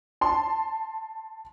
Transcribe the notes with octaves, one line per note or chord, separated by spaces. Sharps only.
A5 C6